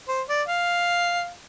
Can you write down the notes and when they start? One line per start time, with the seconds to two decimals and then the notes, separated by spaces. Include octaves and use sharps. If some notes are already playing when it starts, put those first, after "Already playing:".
0.09 C5
0.29 D5
0.48 F5